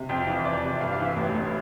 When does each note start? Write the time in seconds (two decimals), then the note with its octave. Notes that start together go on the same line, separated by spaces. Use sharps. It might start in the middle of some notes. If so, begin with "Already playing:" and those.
Already playing: C3
0.09 F2 G5
0.21 F5
0.27 E3
0.33 E5
0.45 F2 D5
0.64 C3
0.81 G2 F5
0.93 F5
0.99 E3
1.05 E5
1.16 A1
1.35 A1